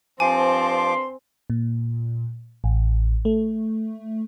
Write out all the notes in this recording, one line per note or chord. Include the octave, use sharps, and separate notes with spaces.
G2 F3 C4 G#5 A5 C6 D6
A#2
A1
A3